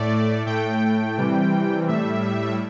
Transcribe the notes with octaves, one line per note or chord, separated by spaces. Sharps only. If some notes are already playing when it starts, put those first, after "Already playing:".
Already playing: A2 A3 D5
A2 A3 G5
C3 E3 G3
A2 G3 E5